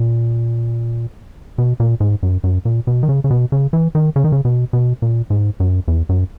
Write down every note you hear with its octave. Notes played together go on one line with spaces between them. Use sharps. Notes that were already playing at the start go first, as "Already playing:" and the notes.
Already playing: A#2
B2
A#2
G#2
F#2
F#2
A#2
B2
D#3
C#3
C#3
B2
C#3
E3
D#3
C#3
D#3
C#3
B2
B2
A#2
G#2
F#2
E2
F#2